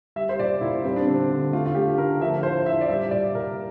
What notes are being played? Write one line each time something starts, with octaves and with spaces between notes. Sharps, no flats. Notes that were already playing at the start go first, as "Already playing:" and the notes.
G3 E5
C5
A#2 D5
A#2 E4
G3 C4
D4
D3 C4
D3
A3 F4
F4
A3 G4
D3 A#4
F3 E5
A2 C5
A2 E5
D5
G3 E5
A#2 D5
A#2 A#4